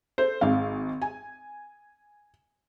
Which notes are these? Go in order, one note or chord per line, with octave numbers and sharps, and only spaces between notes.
A4 C5
G#1 G#3 F5
G#5